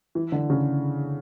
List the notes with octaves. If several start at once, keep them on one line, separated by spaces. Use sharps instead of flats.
E3
D3
C#3